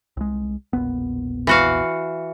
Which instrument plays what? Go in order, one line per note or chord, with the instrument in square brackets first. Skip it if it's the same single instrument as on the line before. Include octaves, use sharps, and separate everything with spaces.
[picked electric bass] C2 G#3
E1 A#1 B3
[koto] E3 F#4 F5